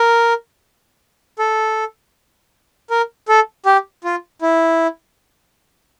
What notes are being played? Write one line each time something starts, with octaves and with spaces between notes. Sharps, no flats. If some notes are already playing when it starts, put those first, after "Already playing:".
Already playing: A#4
A4
A#4
A4
G4
F4
E4